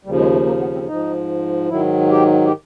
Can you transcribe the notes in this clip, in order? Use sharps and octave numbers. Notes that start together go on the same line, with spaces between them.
D#2 C#3 F3 G3
G#3
A3
A#3
B3
C4
G#2 F3 D#4
G#2 D#3 F#3 E4
G4
G4